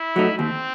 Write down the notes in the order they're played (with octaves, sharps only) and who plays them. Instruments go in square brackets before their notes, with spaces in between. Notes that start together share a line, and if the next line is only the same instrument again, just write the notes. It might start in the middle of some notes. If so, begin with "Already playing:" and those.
Already playing: [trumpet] E4
[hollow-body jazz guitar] F#3 A3 D#4
[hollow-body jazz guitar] D#2 [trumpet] C4